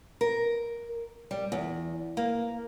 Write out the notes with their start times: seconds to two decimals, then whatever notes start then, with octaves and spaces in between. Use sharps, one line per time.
0.21 A#4
1.31 G3
1.52 E2
2.17 A#3